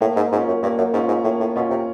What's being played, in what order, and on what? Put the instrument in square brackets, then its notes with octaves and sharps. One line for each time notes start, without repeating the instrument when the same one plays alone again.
[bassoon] A2 [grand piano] A#3
[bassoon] G#2
[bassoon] G#2 [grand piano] C#4 F4
[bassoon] F#2
[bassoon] G2 [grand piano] A#3
[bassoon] F#2
[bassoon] G#2 [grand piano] C#4 F4
[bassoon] G#2
[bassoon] A2 [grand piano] A#3
[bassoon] A2
[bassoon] B2 [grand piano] C#4 F4
[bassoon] C3